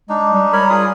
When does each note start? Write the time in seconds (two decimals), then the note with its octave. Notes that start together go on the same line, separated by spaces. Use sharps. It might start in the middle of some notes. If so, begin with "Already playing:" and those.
0.09 G#3 D4 D#4
0.33 G3
0.53 A#4 C#5 B5
0.70 F4 G#4 D#6